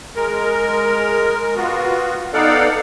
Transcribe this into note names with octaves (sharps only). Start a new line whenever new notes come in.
G#3 A#4
B3 F4 F#4
B3 D#4 A4 D5 F5 F#5